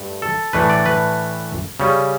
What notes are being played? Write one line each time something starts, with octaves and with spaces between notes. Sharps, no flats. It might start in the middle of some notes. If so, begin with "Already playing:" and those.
Already playing: G2 A3
A4
A2 E3 A3 D4 B4
D5
B4
C#3 G3 C#4